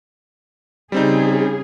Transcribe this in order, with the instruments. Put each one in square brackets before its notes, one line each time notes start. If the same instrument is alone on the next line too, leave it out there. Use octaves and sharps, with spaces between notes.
[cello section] C#3 G#4 [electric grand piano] G3 C4 D#4